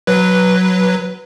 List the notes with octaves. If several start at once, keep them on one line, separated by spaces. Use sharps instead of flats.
F#3 B4